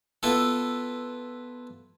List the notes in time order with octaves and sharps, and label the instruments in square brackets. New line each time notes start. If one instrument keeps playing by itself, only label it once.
[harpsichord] B3 E4 F4 A4